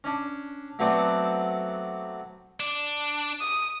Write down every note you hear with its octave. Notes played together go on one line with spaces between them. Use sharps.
C#4 D4
F#3 A3 B3 C4 C5 D5
D4
D#6